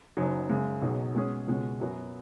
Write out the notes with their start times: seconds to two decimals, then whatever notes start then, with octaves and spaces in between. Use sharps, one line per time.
0.17 F#1 F#2 F#3 D#4
0.50 F#2 C#3 G#3
0.82 B1 B2 F#3 D#4 G#4
1.15 B2 G#3 C#4 G#4
1.47 C#2 B2 G#3 C#4
1.79 F#2 F#3 B3 F#4